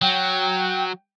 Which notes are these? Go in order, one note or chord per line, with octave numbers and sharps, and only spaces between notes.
F#3 G5